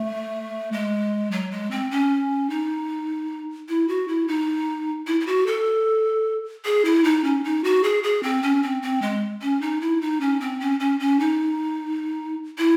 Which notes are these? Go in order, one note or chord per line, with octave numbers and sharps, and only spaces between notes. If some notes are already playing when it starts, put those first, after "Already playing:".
Already playing: A3
G#3
F#3
G#3
C4
C#4
D#4
E4
F#4
E4
D#4
E4
E4
F#4
A4
G#4
E4
D#4
C#4
D#4
F#4
G#4
G#4
C4
C#4
C4
C4
G#3
C#4
D#4
E4
D#4
C#4
C4
C#4
C#4
C#4
D#4
E4